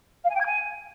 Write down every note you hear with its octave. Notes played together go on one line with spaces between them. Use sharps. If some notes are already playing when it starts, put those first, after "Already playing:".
F5
G#5
G5
G#6
G#5